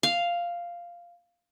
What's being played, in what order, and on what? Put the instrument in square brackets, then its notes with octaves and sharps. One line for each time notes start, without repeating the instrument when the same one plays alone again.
[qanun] F5